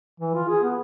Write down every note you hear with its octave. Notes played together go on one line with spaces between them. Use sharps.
E3
F4
G#4
B3